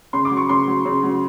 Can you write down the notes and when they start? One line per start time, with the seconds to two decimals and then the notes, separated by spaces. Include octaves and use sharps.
0.13 C#3 C6
0.25 D6
0.31 F#3
0.37 C#6
0.49 C#3 C6
0.67 F#3
0.85 C#3
1.03 F#3